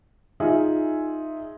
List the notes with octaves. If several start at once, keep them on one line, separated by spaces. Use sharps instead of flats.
D#4 F4 G#4 E5 G#5